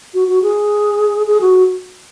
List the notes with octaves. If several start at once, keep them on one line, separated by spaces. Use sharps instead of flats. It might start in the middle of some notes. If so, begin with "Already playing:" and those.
F#4
F#4
G#4
G#4
F#4